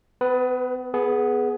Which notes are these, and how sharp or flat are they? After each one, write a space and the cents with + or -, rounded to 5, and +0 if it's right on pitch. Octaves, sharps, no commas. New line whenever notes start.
B3 +35 B4 +0
B3 +0 G#4 +15